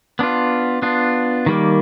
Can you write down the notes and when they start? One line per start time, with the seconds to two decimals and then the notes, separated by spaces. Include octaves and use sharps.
0.19 B3 D4 F4
0.82 B3 D4 F4
1.46 D#3 G3 A#3